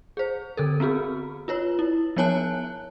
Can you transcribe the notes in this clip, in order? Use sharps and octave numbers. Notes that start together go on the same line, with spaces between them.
G#4 C5
D3 A4 A#4
B3 C4 F#4 G#4
F4 B4 C#5
E4
F3 B3 C#5 G#5 A5 F#6